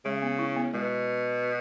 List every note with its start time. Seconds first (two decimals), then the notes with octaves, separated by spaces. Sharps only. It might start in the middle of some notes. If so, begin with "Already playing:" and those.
0.05 C#3 G#3
0.22 B3
0.39 E4
0.56 B3
0.73 B2 G#3